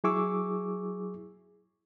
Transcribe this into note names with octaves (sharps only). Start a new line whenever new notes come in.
F#3 E4 G#4 C#6 D6 E6